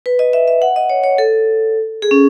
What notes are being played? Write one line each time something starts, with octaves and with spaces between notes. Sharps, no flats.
B4
D#5
E5
E5
F#5
D#5
C#5
C#5
A4
G#4
C#4